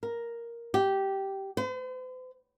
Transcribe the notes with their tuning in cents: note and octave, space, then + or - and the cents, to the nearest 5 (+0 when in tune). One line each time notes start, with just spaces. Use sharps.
A#4 +5
G4 -10
C5 -45